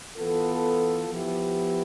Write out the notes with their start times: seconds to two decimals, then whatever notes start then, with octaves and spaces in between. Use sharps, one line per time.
0.16 E3 B3 F4 A4
1.10 F3 B3 E4 G4